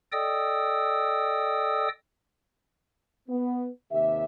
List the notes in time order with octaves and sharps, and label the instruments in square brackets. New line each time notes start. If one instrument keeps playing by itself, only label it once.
[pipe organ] A4 D5 D#5 G5 D#6 E6
[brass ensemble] B3
D#2 C3 D#3 G4 E5